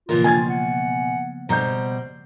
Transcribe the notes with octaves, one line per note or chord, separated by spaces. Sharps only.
A#2 C#3 E3 F3 A#3 F4 A#4
B2 G5 G#5 G#6 A6
F#5
B2 G3 C5 A#5 G6